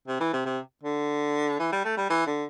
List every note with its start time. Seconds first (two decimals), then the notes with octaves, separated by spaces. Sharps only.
0.08 C3
0.20 E3
0.33 C3
0.45 C3
0.83 D3
1.59 E3
1.72 G3
1.85 A3
1.97 G3
2.10 E3
2.26 D3